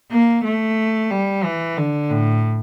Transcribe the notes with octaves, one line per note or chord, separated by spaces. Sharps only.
A#3
A3
G3
E3
D3
A2